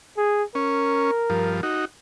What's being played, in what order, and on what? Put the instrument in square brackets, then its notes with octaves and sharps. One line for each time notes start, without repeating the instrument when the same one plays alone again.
[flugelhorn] G#4
[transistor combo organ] C#4 [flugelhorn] A#4
[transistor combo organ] G2 F3
D#4 F#4